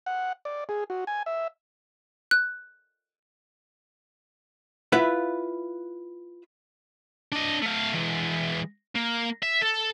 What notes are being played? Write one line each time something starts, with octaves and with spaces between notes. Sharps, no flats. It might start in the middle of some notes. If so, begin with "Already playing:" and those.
F#5
D5
G#4
F#4
G#5
E5
F#6
E4 F4 B4 E5 F#5
D4 D#5
A3 F5
E3 G#3
A#3
E5
A4